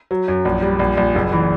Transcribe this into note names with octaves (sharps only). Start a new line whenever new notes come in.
F#3
F#2
A#1
G3
A#1
A#1
F#1
E3